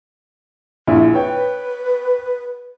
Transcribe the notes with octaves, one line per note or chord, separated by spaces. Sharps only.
A#1 E4
B4 C#5 G5